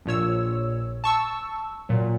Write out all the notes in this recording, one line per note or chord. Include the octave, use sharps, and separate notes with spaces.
A#1 A#2 C#5 E6
A5 C#6 E6
A#2 F#3